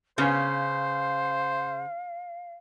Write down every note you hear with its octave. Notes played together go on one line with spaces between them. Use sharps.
C#3 B3 C#4 C5 F5